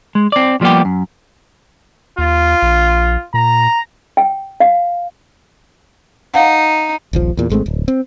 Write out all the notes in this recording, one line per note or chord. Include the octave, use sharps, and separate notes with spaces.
G#3
C4 D5
F3 G3 A#3 B3 G4
F#2
D#2 F4
A#1
A#2 A#5
G5
F5
D#4 F5 F#5
D#1 A#1 F3
E2 A#2
G#1 G#3 A3 C4
D1
C4